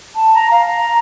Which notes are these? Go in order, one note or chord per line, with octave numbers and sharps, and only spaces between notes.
A5
A#5
F5
A#5